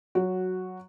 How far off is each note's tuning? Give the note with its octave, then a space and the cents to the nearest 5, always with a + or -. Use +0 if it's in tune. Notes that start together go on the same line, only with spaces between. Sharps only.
F#3 +5 F#4 -5